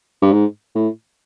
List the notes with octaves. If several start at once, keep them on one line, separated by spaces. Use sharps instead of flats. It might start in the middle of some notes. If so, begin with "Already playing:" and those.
G2
G#2
A2